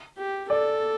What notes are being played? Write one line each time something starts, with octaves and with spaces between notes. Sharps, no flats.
G4
A4 D5